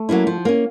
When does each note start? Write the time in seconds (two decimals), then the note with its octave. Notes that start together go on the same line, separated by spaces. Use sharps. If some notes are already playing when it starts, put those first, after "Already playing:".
Already playing: A3
0.09 F#3 A#3 C#4 E4
0.27 F3
0.45 A#3 C#4